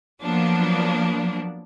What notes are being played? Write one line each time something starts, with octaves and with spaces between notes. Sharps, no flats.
F3 F#3 A#3 B3 D4